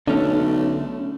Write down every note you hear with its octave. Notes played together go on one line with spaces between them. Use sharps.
B1 D3 A3 C#4 D4